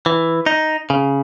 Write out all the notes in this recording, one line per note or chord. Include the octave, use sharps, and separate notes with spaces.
E3
D#4
C#3